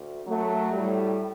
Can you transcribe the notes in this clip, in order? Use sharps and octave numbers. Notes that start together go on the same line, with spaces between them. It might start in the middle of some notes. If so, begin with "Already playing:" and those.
Already playing: D2
F#2 F#3 A3
A2 G3